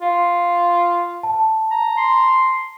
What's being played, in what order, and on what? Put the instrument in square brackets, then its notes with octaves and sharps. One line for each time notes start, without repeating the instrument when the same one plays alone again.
[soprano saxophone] F4
[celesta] A5
[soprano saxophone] A#5
[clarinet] C6